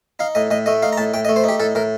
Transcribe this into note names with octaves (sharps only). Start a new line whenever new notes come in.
D#4 F5
A2 D#5
A2 D#5
A3 D#5
D#4 F5
A#5
A2 A5
A2 G5
D#5
A3
C5
D#4 G4
A2 A4
A2 A#4